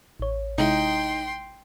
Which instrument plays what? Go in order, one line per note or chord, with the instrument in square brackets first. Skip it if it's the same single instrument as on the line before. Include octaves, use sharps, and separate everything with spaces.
[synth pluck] A1 C#5
[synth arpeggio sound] C3 G#3 E4 [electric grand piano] D#4 [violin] G5 C6